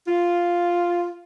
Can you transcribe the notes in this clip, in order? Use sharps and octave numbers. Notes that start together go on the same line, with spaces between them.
F4